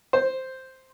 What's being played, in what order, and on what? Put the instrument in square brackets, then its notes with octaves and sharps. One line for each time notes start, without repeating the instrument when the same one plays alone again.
[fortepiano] C5